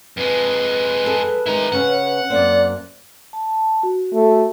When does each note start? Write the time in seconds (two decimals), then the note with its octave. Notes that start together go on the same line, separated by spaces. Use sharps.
0.17 F2 G#3 B4
1.06 G#4 A4
1.46 D#3 G#3 E4 A#5
1.72 C#3 B3 C#4 F#5
2.30 F#2 A#3 C4 D5
3.33 A5
3.83 F#4
4.14 A3